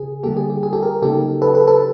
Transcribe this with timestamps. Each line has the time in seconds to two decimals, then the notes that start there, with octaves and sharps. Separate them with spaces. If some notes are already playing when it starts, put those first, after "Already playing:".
Already playing: C#3 G#4
0.23 D3 G3 A#3 G4 A4
0.37 G#4
0.50 G4
0.63 G#4
0.73 G4 A4
0.82 G#4 A#4
1.02 C#3 F#3 A#3 D#4 G4 A4
1.42 A4 B4
1.55 A4 B4
1.67 A4 B4